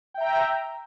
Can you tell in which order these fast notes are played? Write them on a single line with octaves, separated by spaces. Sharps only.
G5 E5 A#5